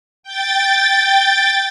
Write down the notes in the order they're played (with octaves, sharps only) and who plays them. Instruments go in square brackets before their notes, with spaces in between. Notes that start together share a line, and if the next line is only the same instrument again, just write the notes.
[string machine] G5 A6